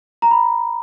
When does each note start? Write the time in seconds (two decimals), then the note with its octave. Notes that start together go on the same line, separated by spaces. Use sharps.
0.22 A#5
0.31 B5